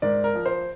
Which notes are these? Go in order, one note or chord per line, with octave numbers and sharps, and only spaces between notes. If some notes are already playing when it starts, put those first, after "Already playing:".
G#2 A#4 D5
A#4
F3
C5